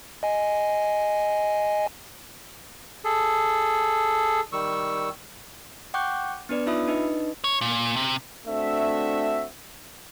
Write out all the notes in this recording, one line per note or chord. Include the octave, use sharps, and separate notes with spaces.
D#5 G#5
G#4 A4
D#3 G3 C#6 E6
F#5 G5 C#6 D6 F#6 G6
B3 D4 B4 D5
D#4 F4 E5 B5 D#6
D4 D#4 B4 D#5
C#5
A#2
C3
A3 C4 D4 F#4 E5